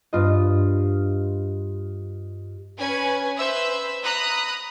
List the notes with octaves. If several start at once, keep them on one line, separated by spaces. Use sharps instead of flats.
G2 F4 D#5
C#4 B4 G#5
B4 C5 E5 E6
A#5 B5 D#6 F#6